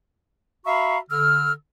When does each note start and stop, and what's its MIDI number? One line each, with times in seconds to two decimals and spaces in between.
0.66 0.98 66
0.66 0.98 76
0.66 0.98 77
0.66 0.98 82
0.66 0.98 83
0.66 0.98 85
1.11 1.53 50
1.11 1.53 88
1.11 1.53 89